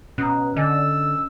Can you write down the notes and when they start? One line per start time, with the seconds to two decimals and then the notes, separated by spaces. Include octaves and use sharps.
0.18 B2 C#4 A#5 D#6 F#6
0.56 D3 D#5 G#5 E6 A6